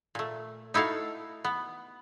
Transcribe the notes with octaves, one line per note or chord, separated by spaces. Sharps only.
A#2 A3
D#4 E4 F#4 A4 F5
B3